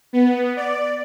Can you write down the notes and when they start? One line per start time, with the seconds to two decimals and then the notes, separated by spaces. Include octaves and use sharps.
0.13 B3
0.56 D5